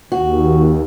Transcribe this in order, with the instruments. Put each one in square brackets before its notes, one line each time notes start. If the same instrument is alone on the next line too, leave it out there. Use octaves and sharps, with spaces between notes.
[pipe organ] D#2 [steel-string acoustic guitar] F#4